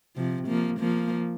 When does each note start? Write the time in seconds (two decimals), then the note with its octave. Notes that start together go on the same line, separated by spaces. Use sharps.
0.16 C3 F3
0.48 F3 A#3
0.80 F3 A#3